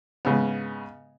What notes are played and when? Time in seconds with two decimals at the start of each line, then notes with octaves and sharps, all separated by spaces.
0.25 G#2 C#3 B3